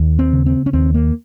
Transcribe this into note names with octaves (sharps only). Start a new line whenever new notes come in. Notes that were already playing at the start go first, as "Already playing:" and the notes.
Already playing: D#2
C4
C#3
C4
C#4
D#2 C4
A#3